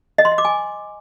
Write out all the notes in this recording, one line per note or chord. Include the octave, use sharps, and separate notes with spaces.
D#5
C6
D#5
D6
G#5